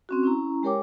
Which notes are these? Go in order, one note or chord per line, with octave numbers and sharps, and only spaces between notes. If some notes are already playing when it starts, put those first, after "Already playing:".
C4 C#4 F#4
C#4 E4 A#5
G#3 G4 A#4 C#5 G5 D6